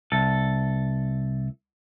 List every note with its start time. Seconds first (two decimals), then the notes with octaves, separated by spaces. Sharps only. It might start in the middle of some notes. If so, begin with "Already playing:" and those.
0.12 C2 A4